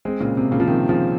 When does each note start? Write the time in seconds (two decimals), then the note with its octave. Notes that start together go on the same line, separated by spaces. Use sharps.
0.05 G#3 C4
0.20 A#2 C#3
0.37 C3
0.52 A#2 C#3
0.60 F3
0.67 C3 D#3
0.89 C#3 F3